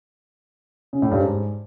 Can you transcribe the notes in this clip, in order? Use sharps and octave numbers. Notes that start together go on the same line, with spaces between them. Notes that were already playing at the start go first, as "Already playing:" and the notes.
C#3
A2
G2
G#2